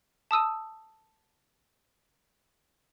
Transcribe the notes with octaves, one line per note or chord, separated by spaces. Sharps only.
A5 D#6 E6 D#7